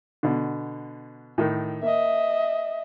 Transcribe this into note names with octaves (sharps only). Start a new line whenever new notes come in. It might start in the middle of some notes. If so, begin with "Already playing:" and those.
B2 D3
A2 D#3
A#3 D#5 E5